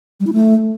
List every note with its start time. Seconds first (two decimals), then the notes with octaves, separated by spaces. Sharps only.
0.20 G3
0.27 E4
0.33 A3